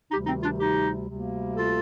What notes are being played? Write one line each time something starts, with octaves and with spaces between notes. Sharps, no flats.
D2 C3 D#3 G3 D#4 G4
C4 D#4
D4 F4
D#4 G4
D2 C3 G3 A#3
F4 A4